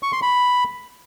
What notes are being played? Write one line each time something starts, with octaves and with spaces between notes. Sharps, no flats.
C#6
C6
B5